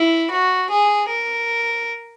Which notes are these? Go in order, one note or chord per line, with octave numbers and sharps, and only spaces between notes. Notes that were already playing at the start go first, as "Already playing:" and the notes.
Already playing: E4
F#4
G#4
A#4